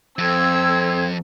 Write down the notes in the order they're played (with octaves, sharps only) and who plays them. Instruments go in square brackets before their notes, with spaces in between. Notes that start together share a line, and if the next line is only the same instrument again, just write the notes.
[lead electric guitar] F2 [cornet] C4 [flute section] A4 G#6 [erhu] E6